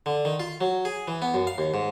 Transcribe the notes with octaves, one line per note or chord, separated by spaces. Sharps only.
D3
D#3
F4
F#3
G#4
E3
B3
F#2
F5
D#2
G#2